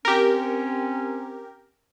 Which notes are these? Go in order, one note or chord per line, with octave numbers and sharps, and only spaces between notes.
C4 C#4 G4 A#4